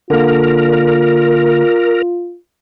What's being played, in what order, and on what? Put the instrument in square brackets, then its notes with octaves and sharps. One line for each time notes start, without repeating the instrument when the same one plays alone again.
[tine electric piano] D3 A#3 [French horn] F4 [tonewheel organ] A#4